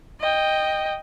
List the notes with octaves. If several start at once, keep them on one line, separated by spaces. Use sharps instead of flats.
D#5 G5